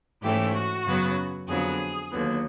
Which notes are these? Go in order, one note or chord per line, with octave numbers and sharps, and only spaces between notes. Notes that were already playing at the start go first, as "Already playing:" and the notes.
G#2 E3 A3 C#4 G4
F#4
F#2 C#3 F#3 B3
F2 D3 F#3 B3 G#4
D#2 D3 F#3 B3